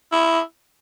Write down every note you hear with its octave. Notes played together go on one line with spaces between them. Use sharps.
E4